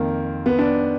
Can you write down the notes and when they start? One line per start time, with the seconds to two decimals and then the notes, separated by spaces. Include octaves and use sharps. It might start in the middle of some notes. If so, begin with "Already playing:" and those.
Already playing: F2 D#3 A#3
0.46 B3
0.59 D4